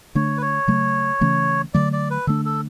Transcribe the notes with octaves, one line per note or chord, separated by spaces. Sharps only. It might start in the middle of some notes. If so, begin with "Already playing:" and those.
D3 A3 D4 C#5
B4
C#5
C#3 F#3 A3
C#3 E3 A3 C#4
D3 F#3 A3 D5
D5
B4
D3 A3 D4 A4
A4